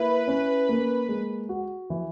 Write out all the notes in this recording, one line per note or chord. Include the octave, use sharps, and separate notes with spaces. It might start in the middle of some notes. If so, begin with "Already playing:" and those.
Already playing: A#3 E4 B4
C#4
A#3
G#3
F#4
E3